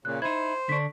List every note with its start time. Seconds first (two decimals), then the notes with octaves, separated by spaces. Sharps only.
0.05 A#2 C#3 F#6
0.22 D#4 E4 C5 G#6
0.69 D3 D4 C#6 B6